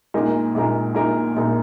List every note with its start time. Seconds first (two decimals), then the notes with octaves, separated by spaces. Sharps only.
0.14 A#1 A#2 G#3 D#4 A#4
0.55 A#1 A#2 G#3 D#4 A#4
0.95 A#1 A#2 G#3 D#4 A#4
1.36 A#1 A#2 G#3 D#4 A#4